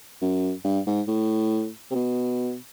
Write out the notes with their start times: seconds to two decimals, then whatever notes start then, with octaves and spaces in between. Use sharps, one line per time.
0.22 F#2
0.65 G2
0.87 G#2
1.08 A2
1.91 C3
1.95 B2